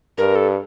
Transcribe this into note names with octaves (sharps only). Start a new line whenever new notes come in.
G2 A#4
A4